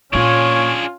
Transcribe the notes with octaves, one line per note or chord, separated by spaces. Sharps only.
A#2 A#3 C#4 D4 F4 G#4 C#5